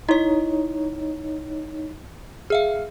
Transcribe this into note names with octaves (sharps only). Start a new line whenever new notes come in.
D#4 E4 C#5 D#5
G#4 E5 F5 F6